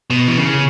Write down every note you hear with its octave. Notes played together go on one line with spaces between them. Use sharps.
B2
E3
C#3